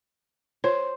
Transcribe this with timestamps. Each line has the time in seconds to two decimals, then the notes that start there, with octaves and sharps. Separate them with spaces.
0.64 F4 C5 C#5